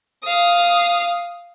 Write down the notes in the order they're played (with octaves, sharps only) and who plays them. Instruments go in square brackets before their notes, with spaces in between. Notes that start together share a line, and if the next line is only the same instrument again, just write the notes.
[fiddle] F5 D#6